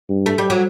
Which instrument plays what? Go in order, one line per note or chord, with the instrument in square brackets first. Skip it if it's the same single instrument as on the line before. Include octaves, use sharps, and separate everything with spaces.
[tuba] G2
[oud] A3
G3
F#3